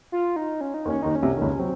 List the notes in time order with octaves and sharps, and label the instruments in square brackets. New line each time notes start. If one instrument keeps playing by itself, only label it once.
[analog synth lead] F4
D#4
C#4
D#4
[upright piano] D#2 D#3
[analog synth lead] C#4
[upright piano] D#2 D#3 [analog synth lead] D#4
[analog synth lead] C#4
[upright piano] C2 C3
D#3
C#2 C#3
[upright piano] F#3 [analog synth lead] C4